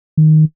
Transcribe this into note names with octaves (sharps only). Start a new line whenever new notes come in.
D#3